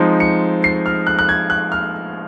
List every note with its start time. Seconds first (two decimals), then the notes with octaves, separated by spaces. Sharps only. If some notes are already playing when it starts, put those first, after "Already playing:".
Already playing: F3 G#3 C4 D#4
0.20 C#7
0.64 C7
0.86 F6
1.07 F#6
1.19 F#6
1.29 G#6
1.50 F#6
1.72 F6